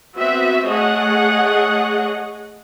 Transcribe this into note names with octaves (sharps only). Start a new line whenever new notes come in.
B3 C4 F#4 E5
A3 G#4 C#5 D#5 F#5